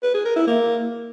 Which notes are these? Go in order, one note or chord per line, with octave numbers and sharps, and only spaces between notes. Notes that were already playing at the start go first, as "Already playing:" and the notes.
B4
G#4
A#4
E4
A#3